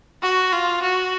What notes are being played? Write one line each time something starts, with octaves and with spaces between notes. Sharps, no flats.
F#4
F4
F#4